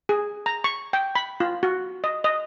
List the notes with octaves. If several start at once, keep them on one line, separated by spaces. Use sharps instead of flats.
G#4
A#5
C#6
G5
B5
F4
F#4
D#5
D#5